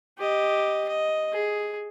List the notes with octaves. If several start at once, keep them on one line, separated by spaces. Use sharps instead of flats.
G4 D#5
D#5
G#4